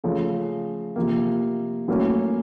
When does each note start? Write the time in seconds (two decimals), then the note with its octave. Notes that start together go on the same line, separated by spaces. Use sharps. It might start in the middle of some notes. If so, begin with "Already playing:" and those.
0.04 C#3 F3 A3
0.96 C3 F3 A#3
1.88 A2 F#3 A#3 C#4